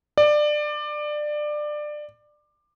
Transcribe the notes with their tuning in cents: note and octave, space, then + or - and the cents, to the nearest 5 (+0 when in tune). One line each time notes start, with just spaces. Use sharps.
D5 +20